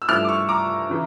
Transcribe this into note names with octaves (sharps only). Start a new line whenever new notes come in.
E6
G2 F3 A3 E4 D6 F6
D6
C#6 E6
A#5 D6
C#3 E3